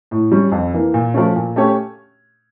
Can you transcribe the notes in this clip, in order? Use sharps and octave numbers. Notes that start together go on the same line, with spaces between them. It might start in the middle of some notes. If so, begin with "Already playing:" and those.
A2
G3 C#4
F2
E3 A#3
A#2
F3 A3 C#4
A#2
A3 C#4 G4 C#5